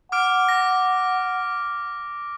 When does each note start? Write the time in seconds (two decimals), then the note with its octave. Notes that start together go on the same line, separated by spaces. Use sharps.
0.12 F#5 D6 F6 D7
0.49 A#6